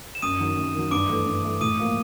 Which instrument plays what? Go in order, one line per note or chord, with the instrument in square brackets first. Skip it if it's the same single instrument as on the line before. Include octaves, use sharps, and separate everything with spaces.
[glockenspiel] E7
[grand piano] F#2 [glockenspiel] D#6 D#7
[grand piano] D#3 F#3
F#2
D#3 F#3
[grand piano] G2 [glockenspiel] D6 D7
[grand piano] E3 A3
G2
E3 A3
[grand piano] A2 [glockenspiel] D#6 D#7
[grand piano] F3 A#3